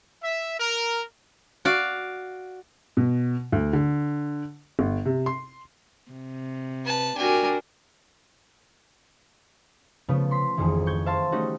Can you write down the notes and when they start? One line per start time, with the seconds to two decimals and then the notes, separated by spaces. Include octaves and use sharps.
0.23 E5
0.58 A#4
1.65 F#4 D5 F5
2.97 B2
3.52 D2
3.73 D3
4.79 G1
5.05 C3
5.26 C6
6.11 C3
6.85 B4 A5
7.17 D4 F#4 G4 A#4 G#5
10.08 C#3 F3 A3 B3
10.31 C6 B6
10.57 G#1 F2 G#2 D#3 E3
10.86 C#6 G6 G#6
11.06 C5 E5 F5 A5 C6
11.32 G3 A3 C#4 D#4 F#4